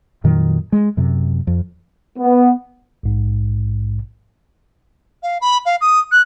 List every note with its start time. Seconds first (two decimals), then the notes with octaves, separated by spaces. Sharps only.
0.24 F2 A#2 D#3 F#3
0.72 G#3
0.97 F#2 C3
1.47 F2
2.18 B3
3.03 A#1 G#2
5.23 F5
5.41 B5
5.66 F5
5.81 D#6
6.12 F#6